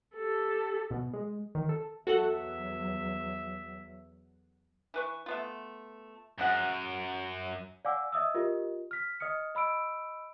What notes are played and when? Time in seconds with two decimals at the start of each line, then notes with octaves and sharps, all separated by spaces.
0.15 G4 A4
0.91 B2
1.13 G#3
1.55 D#3
1.69 A4
2.07 E2 F#3 F#4 A4 E5 F#5
4.94 E3 B4 C#6
5.26 A3 B3 F4
6.39 F#2 G#4 F#5
7.85 D5 F5 F#5 G#5 D6 E6
8.12 D#5 E5 D#6 E6
8.34 F4 G4 A#4 D#5
8.91 F6 B6
9.20 D#5 D#6 F6 C#7
9.55 D#5 B5 E6 D7